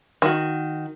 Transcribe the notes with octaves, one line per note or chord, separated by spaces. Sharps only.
D#3 F#4